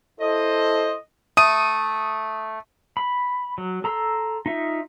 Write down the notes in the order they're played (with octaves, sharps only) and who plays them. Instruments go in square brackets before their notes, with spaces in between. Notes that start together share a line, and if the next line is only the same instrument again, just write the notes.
[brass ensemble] E4 A4 C5 [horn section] D#5
[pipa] A3 [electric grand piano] D#6 D#7
[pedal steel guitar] B5
F#3
A4 A#5 C6 E6
D#4 F4 E5